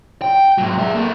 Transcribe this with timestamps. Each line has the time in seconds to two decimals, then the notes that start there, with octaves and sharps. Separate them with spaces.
0.22 G5
0.58 G#2 F#3
0.79 G#4 E5
0.94 A#3 A4